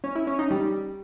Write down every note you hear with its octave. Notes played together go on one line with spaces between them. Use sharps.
C#4
E4
C#4
D#4
G3